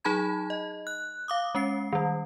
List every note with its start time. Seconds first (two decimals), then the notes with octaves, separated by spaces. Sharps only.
0.05 F#3 D#4 G#4 A5 B5 G#6
0.50 D#5
0.87 F#6
1.28 F5 D6 D#6
1.55 G#3 C#4 C7
1.93 D#3 G3